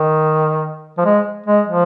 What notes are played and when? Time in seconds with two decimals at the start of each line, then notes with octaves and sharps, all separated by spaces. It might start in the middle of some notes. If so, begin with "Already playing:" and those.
Already playing: D#3
0.98 F3
1.05 G#3
1.46 G#3
1.67 F3